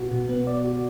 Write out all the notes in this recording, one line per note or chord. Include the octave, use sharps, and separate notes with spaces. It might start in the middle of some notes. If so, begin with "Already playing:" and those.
Already playing: B2 B3 F#4
B2
B3
D5
F#4